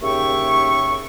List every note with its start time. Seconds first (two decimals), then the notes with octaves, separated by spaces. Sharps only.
0.02 D#2 C#3 C#5 E5 G5 C#6